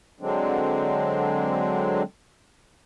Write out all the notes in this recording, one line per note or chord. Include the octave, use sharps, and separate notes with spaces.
D3 F#3 G#3 C4 D4